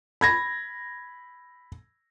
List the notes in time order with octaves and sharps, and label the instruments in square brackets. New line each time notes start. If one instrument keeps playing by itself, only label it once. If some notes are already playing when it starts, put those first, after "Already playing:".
[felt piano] B5 G#6 A#6